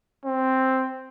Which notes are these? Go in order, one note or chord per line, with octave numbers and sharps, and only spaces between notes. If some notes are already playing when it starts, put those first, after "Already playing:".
C4